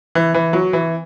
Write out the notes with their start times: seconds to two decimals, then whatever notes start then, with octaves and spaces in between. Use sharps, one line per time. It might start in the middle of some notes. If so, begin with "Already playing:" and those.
0.15 E3
0.34 E3
0.53 F#3
0.73 E3